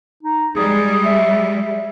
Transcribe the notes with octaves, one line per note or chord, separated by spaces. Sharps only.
D#4
G3 G#3 G#4
E5